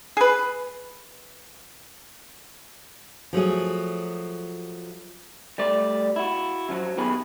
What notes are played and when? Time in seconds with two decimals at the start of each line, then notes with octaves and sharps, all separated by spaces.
0.17 G#4 B4
3.33 F3 F#3 A3 G#4
5.58 G3 A3 D5
6.16 E4 F#4
6.69 F#2 F3 F#3
6.97 A#2 D#3 B3 G4 G#4 B5